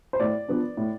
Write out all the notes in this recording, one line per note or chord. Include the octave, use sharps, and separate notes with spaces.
C5
A2 D5
F3 B3 D4
A2